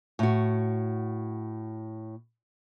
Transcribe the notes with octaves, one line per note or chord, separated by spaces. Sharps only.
A2 F#4